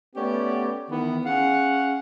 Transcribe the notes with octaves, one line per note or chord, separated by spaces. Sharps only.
A3 B3 C#4 G4 D5
D#3 E3 B3
C#4 G#4 F5 F#5